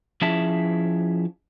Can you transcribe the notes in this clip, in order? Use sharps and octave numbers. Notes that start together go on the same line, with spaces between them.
F3 C#4 E4 G#4 E5 A5